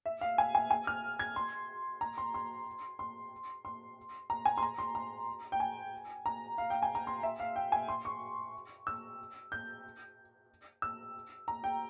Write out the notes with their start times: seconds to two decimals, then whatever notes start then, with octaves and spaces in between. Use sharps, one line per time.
0.06 E5
0.21 F5
0.38 G#5
0.55 G#5
0.71 G#5
0.87 F6
1.19 G#6
1.36 C6
2.01 A#5
2.18 C6
2.34 C6
2.99 C6
3.65 C6
4.30 A#5
4.45 G#5
4.58 C6
4.63 A#5
4.78 C6
4.95 A#5
5.52 G5
5.60 G#5
6.26 A#5
6.58 F5
6.70 G5
6.82 G#5
6.95 A#5
7.07 C6
7.23 E5
7.40 F5
7.56 G5
7.72 G#5
7.88 C6
8.05 C#6
8.87 E6
9.52 G6
10.82 E6
11.48 A#5
11.64 G5